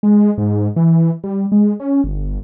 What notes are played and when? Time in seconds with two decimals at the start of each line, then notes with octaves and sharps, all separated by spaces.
0.03 G#3
0.38 G#2
0.76 E3
1.24 G3
1.52 G#3
1.80 C#4
2.04 G1